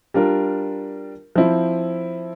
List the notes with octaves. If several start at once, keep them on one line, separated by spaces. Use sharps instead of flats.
G3 D4 F4 A#4
F3 C4 E4